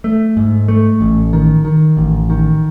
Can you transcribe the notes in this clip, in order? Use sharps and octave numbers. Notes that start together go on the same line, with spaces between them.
A3
G#2
A3
A1
D#3
D#3
A1
D#3